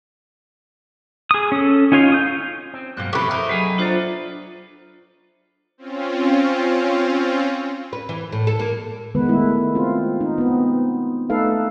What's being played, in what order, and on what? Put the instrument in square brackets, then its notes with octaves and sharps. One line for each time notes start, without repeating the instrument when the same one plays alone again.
[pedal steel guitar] G#4 D#6
C#4 A4
C#4 D#4 F4 C#5 F5
F4 D#6 G6
[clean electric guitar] C4
[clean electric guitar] G2 B2 F#3 [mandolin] A#3 C5 F#6
[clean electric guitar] F2 C3 F3 [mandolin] A3 E4 C#6 [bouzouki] G4 B4
[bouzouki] D#4 [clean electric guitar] A#4 C5
[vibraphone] F#3 B5 [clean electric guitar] G4 G#4 G#5
[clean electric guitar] B3 D5 [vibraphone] D4 F4 C5
[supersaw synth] C4 C#4 F4
[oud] B4
E3
A2
A4
A#3
[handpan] D#3 G#3 B3 B4
G#3 A3 E4
C4 F4
D#4
B3 C4
A3 D#4 A4 B4 F5